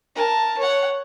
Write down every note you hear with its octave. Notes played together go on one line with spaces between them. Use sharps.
A#4 A5
C#5 F#5